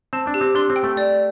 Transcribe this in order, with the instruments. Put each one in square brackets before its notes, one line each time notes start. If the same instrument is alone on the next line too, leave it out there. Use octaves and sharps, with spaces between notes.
[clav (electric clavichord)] C4 [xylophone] A5
[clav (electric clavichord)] D4
[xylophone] G4
[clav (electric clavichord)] C4
[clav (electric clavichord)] D4 [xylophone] C6
[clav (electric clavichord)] C4
[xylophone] G5
[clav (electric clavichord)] A3
[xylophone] D5